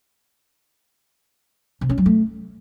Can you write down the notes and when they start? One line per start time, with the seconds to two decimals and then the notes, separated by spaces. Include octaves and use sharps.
1.81 C3
1.89 C#4
1.98 F#3
2.06 A3